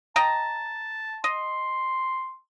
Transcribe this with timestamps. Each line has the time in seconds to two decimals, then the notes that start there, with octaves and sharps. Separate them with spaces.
0.16 D#5 G5 A5 A#5
1.24 D#5 C6